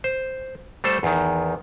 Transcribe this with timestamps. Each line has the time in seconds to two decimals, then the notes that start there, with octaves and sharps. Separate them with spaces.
0.04 C5
0.84 G3 A3 A4 C5
1.03 E2 D#3